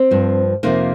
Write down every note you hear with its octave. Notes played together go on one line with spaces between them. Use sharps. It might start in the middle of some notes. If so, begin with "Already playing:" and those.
Already playing: C4
G2 F3
F2 C3 F3 A#3 D#4